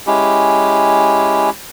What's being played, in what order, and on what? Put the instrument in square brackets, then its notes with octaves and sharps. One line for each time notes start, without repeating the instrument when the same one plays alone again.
[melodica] G#3 C#4 E4 G4